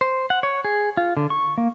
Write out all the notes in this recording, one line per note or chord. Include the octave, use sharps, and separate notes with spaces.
C5
F#5
C#5
G#4
F4
D3
C#6
A#3